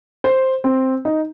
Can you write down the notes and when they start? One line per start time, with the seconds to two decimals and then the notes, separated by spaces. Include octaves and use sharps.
0.24 C5
0.64 C4
1.05 D#4